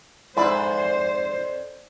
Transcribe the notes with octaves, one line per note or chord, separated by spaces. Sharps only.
F2 G#2 E4 B4 C5 D5